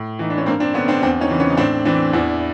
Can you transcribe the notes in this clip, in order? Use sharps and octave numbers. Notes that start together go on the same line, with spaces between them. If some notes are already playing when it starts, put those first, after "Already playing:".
Already playing: A2
E3 D#4
D4
C#4
G2 A#3 C4
C4 D4
D3 B3 C#4
C4 D4
E2 C4 D4
C#4 D#4
C#3 E3
B3 C#4
D#4
A2 C4 D4
E3 C4 D4
E2 D4 E4